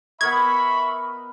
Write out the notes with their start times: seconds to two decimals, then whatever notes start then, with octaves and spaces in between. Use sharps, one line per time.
0.21 B3 A#4 D#5 E5 B5 C#6 G#6